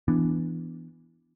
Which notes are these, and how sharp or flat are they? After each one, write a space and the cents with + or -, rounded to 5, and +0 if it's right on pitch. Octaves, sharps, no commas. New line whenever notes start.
E3 +10 B3 +0 D4 +0